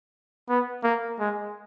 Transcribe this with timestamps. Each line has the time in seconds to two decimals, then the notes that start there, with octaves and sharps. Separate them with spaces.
0.49 B3
0.84 A#3
1.20 G#3